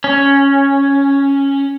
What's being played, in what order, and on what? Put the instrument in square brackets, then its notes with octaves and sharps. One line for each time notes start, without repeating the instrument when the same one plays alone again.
[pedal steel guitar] C#4